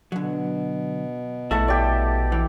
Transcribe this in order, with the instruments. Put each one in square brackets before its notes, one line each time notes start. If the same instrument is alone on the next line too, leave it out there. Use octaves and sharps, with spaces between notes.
[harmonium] B2 [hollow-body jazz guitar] D3 F#3
[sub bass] A#1 [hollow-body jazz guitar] A3 E4 F#4 [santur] A4
[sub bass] A#1 [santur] G4 D5
[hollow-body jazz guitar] E3 [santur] G5